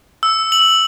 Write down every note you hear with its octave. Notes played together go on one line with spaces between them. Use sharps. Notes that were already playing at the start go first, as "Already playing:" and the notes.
E6
F#7